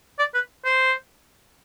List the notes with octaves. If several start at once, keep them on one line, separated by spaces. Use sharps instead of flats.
D5
B4
C5